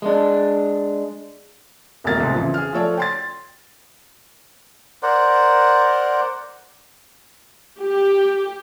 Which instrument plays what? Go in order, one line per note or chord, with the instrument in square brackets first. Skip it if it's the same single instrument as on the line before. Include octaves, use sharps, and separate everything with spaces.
[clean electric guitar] G#3 D4
[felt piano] D#1 G#1 E2 A2 A#4 A6
C2 G#2
F2 C#3 E3
G#4 F6
F3 A3 A4 C#5 D5
G5 C6 A6
[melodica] A#4 C5 D5 F#5
[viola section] G4